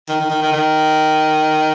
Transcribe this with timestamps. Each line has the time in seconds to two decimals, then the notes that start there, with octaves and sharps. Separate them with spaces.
0.09 D#3
0.20 D#3
0.30 D#3
0.42 D#3
0.52 D#3